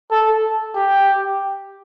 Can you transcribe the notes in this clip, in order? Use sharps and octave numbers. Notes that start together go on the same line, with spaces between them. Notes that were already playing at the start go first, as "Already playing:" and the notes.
A4
G4